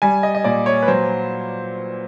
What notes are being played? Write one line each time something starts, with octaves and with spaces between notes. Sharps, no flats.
G3 G#5
D#5
D#5
A#2 D5
C#5
B4
F#3 C5